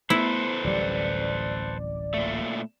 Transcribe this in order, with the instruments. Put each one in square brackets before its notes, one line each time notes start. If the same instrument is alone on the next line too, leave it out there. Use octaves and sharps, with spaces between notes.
[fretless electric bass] A3 [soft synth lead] B3 [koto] E4 [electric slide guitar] A4 B4 C5
[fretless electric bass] D1 A1 G3 [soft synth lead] D5
[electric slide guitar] A#2 A3